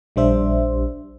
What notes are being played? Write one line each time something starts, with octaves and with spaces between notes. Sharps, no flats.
A#1 G3 D4 C5 E5